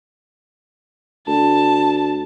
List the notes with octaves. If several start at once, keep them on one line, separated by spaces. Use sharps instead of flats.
D2 A5